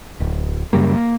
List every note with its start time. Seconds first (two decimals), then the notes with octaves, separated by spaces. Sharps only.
0.20 D1
0.73 F#2 C#3 G3 A#3
0.94 A#3